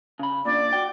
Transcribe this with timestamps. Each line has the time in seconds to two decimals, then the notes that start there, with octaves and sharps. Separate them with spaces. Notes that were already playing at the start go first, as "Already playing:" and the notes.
0.19 C#3 B5
0.45 A#2 D4 D5
0.73 F#4 G5